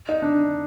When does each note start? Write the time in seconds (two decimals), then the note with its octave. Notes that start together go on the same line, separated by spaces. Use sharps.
0.09 D#4
0.22 D4